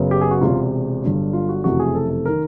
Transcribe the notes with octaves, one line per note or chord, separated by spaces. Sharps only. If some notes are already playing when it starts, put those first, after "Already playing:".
Already playing: F#1 F#2 C#3 F#3 B3
G4
G#4
F#4
E1 E2 C3 F4
G1 G2 D3 F#3
F4
F#4
F#1 F2 C3 E3 A3 F#4
G#4
A4
A4
D#3 A#4